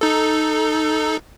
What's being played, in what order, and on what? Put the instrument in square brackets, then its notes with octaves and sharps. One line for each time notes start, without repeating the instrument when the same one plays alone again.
[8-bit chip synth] D#4 A4